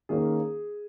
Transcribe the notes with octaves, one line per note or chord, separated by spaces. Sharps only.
D#3 A#3 C#4 G#4